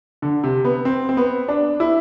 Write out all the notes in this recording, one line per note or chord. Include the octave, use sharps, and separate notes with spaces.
D3
C3
B3
C4
C4
B3
D4
E4